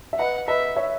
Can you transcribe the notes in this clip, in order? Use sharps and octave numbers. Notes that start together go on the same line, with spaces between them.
E5
B4 D#5 F#5
B4 D#5 E5
C#5 E5